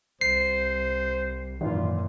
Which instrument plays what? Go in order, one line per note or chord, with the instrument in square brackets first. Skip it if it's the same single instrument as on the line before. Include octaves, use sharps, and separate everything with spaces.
[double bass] C2 [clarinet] C5 [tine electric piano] C7
[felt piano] G#1 E3 [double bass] F#2 A#2 [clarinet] F4